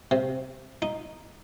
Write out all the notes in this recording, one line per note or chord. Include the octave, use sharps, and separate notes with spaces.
C3
D#4